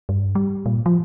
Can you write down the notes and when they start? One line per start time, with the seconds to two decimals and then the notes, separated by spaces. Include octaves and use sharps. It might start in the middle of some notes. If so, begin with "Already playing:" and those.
0.09 G2
0.35 G3
0.66 A#2
0.86 F3